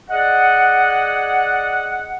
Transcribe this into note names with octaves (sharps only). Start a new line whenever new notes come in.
G#4 D5 D#5 F#5